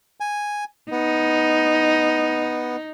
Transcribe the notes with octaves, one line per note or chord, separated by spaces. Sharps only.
G#5
B3 D#4